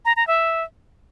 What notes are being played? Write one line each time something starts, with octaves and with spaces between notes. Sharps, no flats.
A#5
A#5
E5